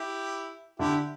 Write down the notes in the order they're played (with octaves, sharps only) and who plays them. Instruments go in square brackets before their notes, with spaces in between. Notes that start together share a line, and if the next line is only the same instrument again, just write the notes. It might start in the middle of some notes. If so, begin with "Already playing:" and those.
Already playing: [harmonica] E4 G4
[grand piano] D3 [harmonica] E4 G4